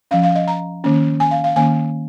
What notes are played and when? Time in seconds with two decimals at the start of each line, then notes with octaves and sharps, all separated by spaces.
0.11 F3 C#4 F5
0.23 F5
0.35 D#5
0.48 A#5
0.84 D#3 A#3 C#4
1.20 G#5
1.31 F5
1.44 F5
1.56 D#3 A#3 C#4 G#5